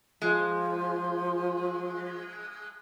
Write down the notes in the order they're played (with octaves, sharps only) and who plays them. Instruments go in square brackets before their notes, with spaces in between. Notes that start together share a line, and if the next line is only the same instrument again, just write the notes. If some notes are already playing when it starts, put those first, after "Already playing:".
[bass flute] F3 [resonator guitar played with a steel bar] G#3